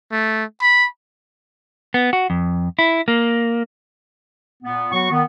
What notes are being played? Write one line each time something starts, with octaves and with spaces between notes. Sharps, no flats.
A3
B5
B3
F#4
F2
E4
A#3
A#2 B3
F#3 B3 F#4 C#6
D#3 B3